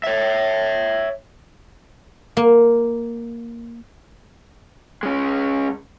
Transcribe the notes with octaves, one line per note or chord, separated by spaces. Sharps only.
C#5 E5
A#3
G#3 C#4